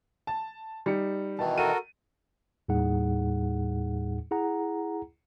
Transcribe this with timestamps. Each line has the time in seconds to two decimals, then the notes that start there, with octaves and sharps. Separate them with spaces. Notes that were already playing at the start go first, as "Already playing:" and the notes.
0.27 A5
0.86 G3 D#4 C#7
1.39 B2 D#3 E3 A5
1.58 F#4 A4 A#4 D#7
2.68 D#2 A2 G3 D#4 G#4 F#5
4.31 E4 G#4 F#5 A#5